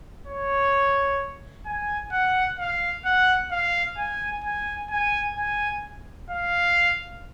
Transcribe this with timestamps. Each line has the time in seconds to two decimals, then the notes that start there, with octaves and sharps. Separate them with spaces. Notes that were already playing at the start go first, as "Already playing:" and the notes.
0.27 C#5
1.66 G#5
2.12 F#5
2.59 F5
3.05 F#5
3.52 F5
3.98 G#5
4.44 G#5
4.91 G#5
5.37 G#5
6.30 F5